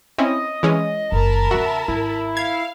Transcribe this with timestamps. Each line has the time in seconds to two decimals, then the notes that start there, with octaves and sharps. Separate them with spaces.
0.18 C4 C#4 E4 D#5
0.63 E3 G#3 C#4
1.12 F#1 D#3 A#4 A5 B5
1.51 E2 C#3 F#4 E5
1.88 G#1 E4
2.37 F5 G#6